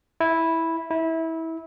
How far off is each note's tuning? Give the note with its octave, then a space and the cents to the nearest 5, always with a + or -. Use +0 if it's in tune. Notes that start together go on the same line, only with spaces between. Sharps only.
E4 -10
E4 -25